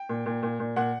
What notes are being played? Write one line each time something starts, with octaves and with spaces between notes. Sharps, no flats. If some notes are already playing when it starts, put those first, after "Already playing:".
Already playing: G5
A#2
A#2
A#2
A#2
A#2 F#5